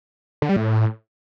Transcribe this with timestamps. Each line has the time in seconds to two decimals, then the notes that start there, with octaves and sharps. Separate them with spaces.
0.42 D3
0.49 G3
0.56 A2